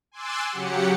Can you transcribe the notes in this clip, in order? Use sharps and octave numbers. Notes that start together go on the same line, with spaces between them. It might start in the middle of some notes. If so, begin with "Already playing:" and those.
G#5 C6 D6 E6 F#6 A6
C#3 F#3 G4 F#5 C#7